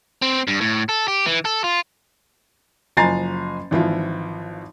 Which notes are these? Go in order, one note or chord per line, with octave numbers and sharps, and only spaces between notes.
C4
G2
A2
A4
G4
E3
A4
F4
F#1 F3 G#5 A#5 A6 C7
G#1 E3 F3 F4